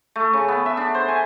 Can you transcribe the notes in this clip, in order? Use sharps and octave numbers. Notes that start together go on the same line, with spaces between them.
A3
C#3
B3
E5
D4
C5
G#5